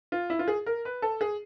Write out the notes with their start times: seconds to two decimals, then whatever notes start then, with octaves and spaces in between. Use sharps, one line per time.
0.12 F4
0.30 E4
0.39 F4
0.48 G#4
0.66 A#4
0.85 B4
1.02 A4
1.21 G#4